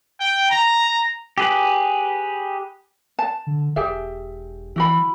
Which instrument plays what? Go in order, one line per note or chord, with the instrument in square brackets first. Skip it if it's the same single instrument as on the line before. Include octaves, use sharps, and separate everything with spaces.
[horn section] G5
A#5
[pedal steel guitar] G4 G#4 B4
[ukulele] A5
[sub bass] D3
[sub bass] E1 [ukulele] G4 G#4 E5
[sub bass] E3 [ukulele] E4 F#4 B5